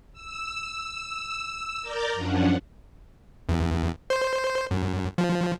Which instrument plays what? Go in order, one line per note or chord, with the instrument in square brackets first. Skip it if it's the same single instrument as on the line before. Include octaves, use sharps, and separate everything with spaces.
[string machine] E6
A#4 D5 A#5 D6 G6 A6
F#2 F3 C#4 D4 F#5
[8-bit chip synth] E2
C5
F#2
F3